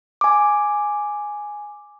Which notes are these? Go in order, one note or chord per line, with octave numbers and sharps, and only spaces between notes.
G#5 D6